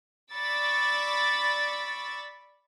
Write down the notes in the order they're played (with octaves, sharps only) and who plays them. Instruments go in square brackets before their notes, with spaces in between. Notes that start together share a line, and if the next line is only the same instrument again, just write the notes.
[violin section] D5 B5 C#6 D6 E6 A6